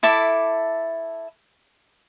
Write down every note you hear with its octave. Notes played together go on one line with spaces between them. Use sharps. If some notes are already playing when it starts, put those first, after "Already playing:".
E4 A4 E5 D6